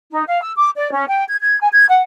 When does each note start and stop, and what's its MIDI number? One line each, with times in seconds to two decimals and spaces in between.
0.11 0.24 63
0.27 0.40 77
0.42 0.51 88
0.57 0.69 86
0.77 0.91 74
0.91 1.06 61
1.09 1.24 79
1.28 1.36 92
1.40 1.59 92
1.60 1.69 80
1.72 1.86 92
1.89 2.02 78